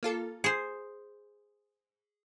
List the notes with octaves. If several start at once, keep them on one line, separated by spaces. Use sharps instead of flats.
A#3 F4 A4
G#4 C5